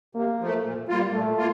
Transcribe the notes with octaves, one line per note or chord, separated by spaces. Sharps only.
C3 A#3
F3 A3
A#2
G3 A#3 F4
A#2 A3
A#3 F4